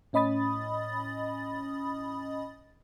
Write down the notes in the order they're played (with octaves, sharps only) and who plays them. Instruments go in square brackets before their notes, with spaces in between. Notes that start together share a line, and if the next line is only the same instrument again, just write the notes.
[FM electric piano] A2 C#4 D#5 B5 D#6 A6